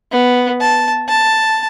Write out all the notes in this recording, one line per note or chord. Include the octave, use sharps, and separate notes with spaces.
B3
A5
A5